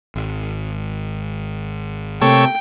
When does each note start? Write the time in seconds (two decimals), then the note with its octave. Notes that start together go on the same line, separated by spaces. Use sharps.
0.15 G#1
2.22 C3 A3 A#3 A4 C#5 G5